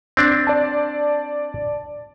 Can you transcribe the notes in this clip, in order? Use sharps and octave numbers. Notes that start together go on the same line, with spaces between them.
C4 D4
D5 A5